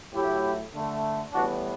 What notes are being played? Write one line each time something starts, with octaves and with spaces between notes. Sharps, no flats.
A2 F#3 A3 E4 G4
D3 A3
A2 E3 G3 B3 D4 F#4